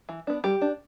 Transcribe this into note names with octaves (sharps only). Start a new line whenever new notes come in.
E3
B3 D4
G3 G4
D4